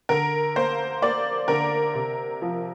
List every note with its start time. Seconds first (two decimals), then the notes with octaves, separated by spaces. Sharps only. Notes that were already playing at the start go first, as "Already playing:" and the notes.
0.09 D3 A#4
0.56 A#3 C5
1.02 A#3 D5
1.48 D3 A#4
1.95 C3
2.42 F3